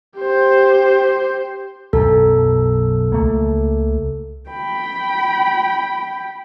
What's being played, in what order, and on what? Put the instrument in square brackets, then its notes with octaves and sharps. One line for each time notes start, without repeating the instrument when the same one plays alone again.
[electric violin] G4 C5
[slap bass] B1 F#2 [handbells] A4
[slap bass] C#2 A3 A#3
[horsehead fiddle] G5 B5